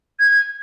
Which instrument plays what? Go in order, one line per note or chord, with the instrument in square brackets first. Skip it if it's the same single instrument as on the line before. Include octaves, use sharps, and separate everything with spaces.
[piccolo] G#6